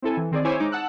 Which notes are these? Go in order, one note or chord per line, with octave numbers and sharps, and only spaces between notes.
C4 E4 A4 G#5
E3
D#3 C4 G#4 D5
E4 C5 C#5 G#5 D6 E6
G#3 D#4 D6
F#5 A5 E6 F#6